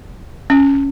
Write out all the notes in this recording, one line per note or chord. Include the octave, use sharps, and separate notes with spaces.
C#4